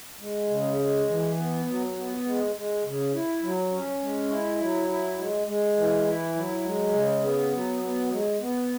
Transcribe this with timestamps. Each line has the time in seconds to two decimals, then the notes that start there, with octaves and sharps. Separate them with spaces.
0.20 G#3
0.50 C#3
0.79 G#3
1.09 E3
1.37 B3
1.67 F#3
1.97 B3
2.25 G#3
2.55 G#3
2.84 C#3
3.14 E4
3.42 F#3
3.71 C#4
4.01 G#3
4.30 E4
4.60 F#3
4.88 E4
5.18 G#3
5.47 G#3
5.76 E3
6.06 E4
6.35 F#3
6.65 G#3
6.94 C#3
7.22 B3
7.53 F#3
7.82 B3
8.11 G#3
8.40 B3